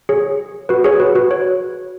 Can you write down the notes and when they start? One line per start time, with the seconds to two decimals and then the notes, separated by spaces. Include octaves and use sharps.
0.09 G#4 C#5
0.69 F#4 B4
0.84 G#4 C#5
1.00 F#4 B4
1.15 F#4 B4
1.31 C#5